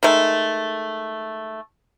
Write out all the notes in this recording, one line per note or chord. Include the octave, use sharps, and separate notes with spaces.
D#3 G#3 A3